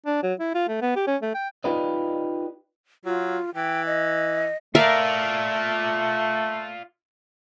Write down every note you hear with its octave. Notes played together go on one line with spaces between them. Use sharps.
D4
F#3
E4
F4
A3
B3
G4
C#4
A3
G5
D#4 F4 G4 B4 D5 D#5
F#3 F4
E3 G5
D#5
A3 F4 A#4 D5 E5 F5